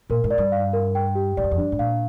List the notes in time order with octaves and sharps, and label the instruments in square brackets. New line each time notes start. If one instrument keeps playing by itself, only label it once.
[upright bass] A#2 [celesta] A#4
[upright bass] G#2
[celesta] D5
[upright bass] G2
[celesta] F5
A#4
G5
G4
[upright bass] G#2 [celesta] D5
[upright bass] G2
F2
[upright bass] G2 [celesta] D4
[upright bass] G#2
[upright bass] A#2 [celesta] F5